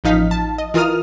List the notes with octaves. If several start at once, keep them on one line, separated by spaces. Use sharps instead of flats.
A1 F3 D#4 F5 B6
A5
D#5
E3 F4 A#4 D#6 F6